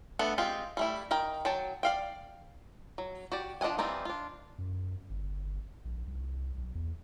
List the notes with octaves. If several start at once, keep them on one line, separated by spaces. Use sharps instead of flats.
A3 B3 D4 A4
G#3 C4 F4 G4
G3 A3 E4
D#3 A#4 G5
F#3 G5 A5
D5 F5 G5
F#3
F#4 G4 D5
F3 D4 D#5 F#5 G#5
E3 G3 C4 D#4 F4
D4 F4
F#2
G1
A#1
C2
B1
E2